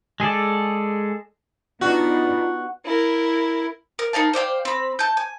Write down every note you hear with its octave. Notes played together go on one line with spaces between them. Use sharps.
G#3 G#4 A4 D5
B3 D4 D#4 F4 F#4
E4 A#4
A#4
D#4 A#4 F5 A5
C5 D5 F5 G5
C4 B5
A5 G6
G#5